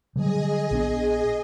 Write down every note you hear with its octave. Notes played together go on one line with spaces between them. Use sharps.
D3 F#3 G3 G#4 D#5
A#1 B3 D4